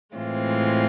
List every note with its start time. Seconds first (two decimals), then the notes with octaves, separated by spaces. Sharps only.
0.16 A2 E3 G#3 C4 F4